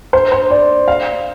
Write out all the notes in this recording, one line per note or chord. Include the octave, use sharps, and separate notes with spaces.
C5
C5
D5
F5